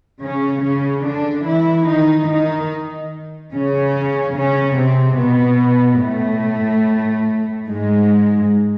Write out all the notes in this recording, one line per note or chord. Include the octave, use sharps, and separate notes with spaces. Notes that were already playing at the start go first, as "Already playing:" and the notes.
C#3 C#4
C#3 C#4
D3 D4
E3 E4
D#3 D#4
D#3 D#4
C#3 C#4
C#3 C#4
C3 C4
B2 B3
A2 A3
G#2 G#3